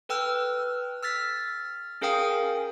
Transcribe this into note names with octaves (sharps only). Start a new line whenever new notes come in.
A4 B4 G5 E6 F6
E6 F6 A6 B6
C#4 G#4 A#4 F5 G5 D#6